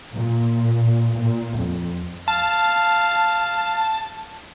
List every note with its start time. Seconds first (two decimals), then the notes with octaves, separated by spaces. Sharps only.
0.14 A#2
1.17 A#2
1.60 F2
2.28 F5 A5